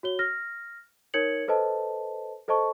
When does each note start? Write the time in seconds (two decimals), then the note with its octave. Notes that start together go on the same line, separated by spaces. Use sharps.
0.03 F#4 C#5 G7
0.19 F6 A#6
1.14 D#4 A#4 C#5 G#6 C#7 F#7
1.48 A4 B4 C5 D#5 A5
2.48 A4 C5 D#5 A5 C#6